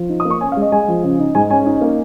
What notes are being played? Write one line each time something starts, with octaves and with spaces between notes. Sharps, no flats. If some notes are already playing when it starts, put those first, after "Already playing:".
Already playing: F3
D#4
D#6
A#3
C#6
C#4 G#5
F5
G#3 D#5
G#3 G#5
F3
C#3
D#4
G#2 G#5
C#4 G#5
D#4
A#3